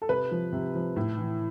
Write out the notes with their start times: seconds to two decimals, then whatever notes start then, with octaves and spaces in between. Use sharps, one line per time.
0.02 A4
0.09 C3 B4
0.31 F3
0.53 C3
0.75 F3
0.96 A2
1.18 E3